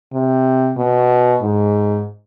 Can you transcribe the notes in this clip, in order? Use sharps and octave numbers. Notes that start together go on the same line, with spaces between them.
C3
B2
G#2